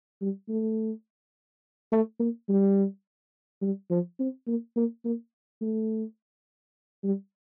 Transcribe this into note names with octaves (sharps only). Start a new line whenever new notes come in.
G3
A3
A3
A#3
G3
G3
F3
C4
A#3
A#3
A#3
A3
G3